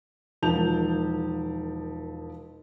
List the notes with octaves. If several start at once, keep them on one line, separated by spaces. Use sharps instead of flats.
E1 D#3 F3 A5 G6 F7